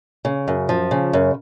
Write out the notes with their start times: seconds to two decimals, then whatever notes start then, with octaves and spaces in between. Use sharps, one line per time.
0.25 C#3
0.48 F#2
0.69 F3
0.91 C#3
1.13 F#2